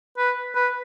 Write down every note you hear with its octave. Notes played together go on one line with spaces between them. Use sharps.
B4
B4